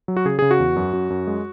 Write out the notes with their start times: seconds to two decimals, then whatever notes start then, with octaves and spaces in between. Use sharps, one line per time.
0.08 F#3
0.17 F#4
0.25 C#3 G#4
0.39 C#3 G#4
0.51 F#4
0.60 E2
0.76 F#2
0.93 F#2
1.10 F#2
1.27 G#3